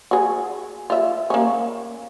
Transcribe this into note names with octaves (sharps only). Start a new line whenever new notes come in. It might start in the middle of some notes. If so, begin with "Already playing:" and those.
F#4 G#4
F4 E5
A#3 C#4